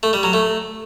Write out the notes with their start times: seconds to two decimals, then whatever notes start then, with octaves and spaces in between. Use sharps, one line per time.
0.03 A3
0.13 G3
0.23 F#3
0.33 A3